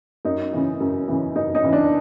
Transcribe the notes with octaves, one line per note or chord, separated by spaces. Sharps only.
F#2 D#4
C#3 E3
F#2
C#3 E3
F#2 D#4
D#4
C#3 E3
D4